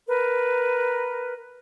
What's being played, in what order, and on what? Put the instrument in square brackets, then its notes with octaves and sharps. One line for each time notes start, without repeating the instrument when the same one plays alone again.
[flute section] A#4 B4